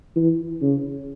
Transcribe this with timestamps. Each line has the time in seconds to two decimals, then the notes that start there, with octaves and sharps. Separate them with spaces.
0.16 E3
0.62 C#3